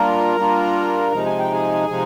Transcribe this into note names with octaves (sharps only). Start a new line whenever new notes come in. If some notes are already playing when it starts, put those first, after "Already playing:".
Already playing: G3 A#3 D4 F4 A#4 A#5
G3 A#3 D4 F4
C3 F3 G#3 D#4 A#5
G#5
G5
G#4 G#5
C3 F3 G#3 D#4